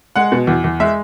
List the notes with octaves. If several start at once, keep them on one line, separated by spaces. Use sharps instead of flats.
G#3 F#5
B2
E2
E2
G#3 E5